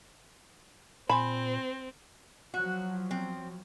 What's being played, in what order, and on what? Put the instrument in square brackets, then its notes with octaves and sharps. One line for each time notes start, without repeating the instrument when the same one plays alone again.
[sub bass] A#2 [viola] C4 [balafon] G#5 C6 [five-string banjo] B5
[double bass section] F3 F#3 [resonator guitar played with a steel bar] F#4
[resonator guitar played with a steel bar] C4